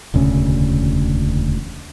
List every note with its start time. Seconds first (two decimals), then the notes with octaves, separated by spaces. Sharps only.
0.14 E1 D2 C#3 C#4